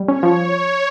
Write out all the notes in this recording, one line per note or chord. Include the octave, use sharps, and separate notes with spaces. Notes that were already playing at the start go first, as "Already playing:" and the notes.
Already playing: G3
C#4 C#5
F3